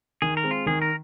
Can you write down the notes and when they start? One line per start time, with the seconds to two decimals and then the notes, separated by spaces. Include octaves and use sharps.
0.22 D#3 G#4
0.37 A#4
0.43 G#3 C4
0.51 F4
0.66 D#3 G#4
0.82 A#4